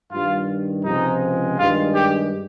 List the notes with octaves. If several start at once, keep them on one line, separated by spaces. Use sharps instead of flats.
G2 D#3 G3 F4
C#2 C3 F3 G#3 D#4
G2 D#3 G#3 F4
G4